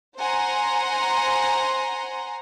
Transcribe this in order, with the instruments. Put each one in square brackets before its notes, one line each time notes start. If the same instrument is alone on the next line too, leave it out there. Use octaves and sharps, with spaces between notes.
[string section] C5 F#5 G#5 A#5 C6